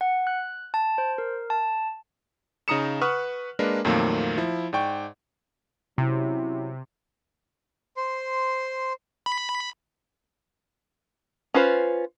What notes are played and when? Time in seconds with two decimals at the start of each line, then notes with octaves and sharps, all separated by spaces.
0.01 F#5
0.27 F#6
0.74 A5
0.98 C5
1.18 A#4
1.50 A5
2.68 C#3 D#4 A#5 D#6 C#7 E7
3.01 B4 F#5 C#6 D#6 F6 F#6
3.59 G#3 A#3 D4 A#4 B4
3.85 F2 A#2 D#3 F#3 A3 A#3
4.37 F3 E4
4.73 G#2 D5 G5 C#6
5.98 C3 F#3 C#4 E4
7.97 C5 C6
9.26 B5
11.54 C#4 F4 B4 C5